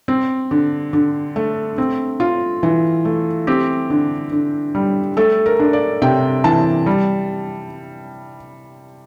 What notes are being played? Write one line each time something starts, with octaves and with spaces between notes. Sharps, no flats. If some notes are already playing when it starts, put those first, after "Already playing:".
C4
D3
D3
A3
C4
F4
E3
A3
C4 G4
D3
D3
G3
A3 A4
A#4
D4
D5
C3 G5
E3 A5
G3